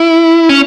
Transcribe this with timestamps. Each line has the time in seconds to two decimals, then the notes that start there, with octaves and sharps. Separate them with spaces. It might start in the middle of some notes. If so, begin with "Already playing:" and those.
Already playing: E4
0.49 C#4